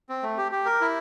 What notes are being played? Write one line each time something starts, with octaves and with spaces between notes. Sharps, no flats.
C4
A3
G4
G4
A#4
E4